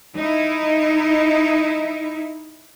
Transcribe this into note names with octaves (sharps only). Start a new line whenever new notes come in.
D#4 E4